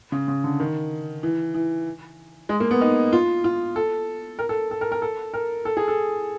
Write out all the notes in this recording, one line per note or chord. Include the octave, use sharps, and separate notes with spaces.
C#3
C#3
D3
D#3
E3
E3
G#3
A#3
B3
D#4
F4
F4
A4
A#4
A4
A4
A#4
A#4
A4
A#4
A4
G#4
A4